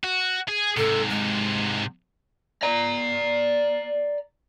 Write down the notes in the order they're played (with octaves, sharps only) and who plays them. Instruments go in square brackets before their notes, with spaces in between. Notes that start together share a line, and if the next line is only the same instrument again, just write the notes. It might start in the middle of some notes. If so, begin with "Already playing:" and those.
[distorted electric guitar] F#4
G#4
[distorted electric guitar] G#2 C3 [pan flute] A4
[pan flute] G#3
[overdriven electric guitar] D5 A#5